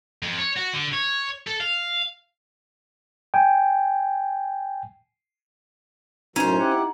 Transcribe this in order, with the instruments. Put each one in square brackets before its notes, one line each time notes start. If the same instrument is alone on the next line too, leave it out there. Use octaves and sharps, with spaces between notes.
[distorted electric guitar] F2
C#5
F#4
D3
C#5
A4
F5
[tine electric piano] G5 G#5
[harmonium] F#2 A2 F#3 [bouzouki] C#4 C5 [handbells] D#4
[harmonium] E4 G4 F#5